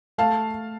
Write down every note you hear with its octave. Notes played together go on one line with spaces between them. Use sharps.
A3 F5 A5